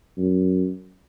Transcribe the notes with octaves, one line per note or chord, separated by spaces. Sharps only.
F#2